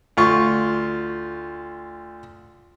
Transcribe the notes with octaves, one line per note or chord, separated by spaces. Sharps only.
D2 F4 C#6